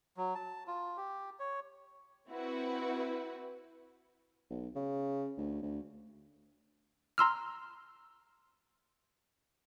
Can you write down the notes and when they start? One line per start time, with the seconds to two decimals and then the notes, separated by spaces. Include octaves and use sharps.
0.17 F#3
0.35 A5
0.67 F4
0.97 G4
1.40 C#5
2.28 C4 E4 F#4 B4
4.50 B1
4.75 C#3
5.38 D2
5.62 D2
7.18 A#5 C6 E6 F6